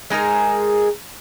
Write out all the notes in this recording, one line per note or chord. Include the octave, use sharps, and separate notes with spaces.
G#3 D#4 G#4 A#4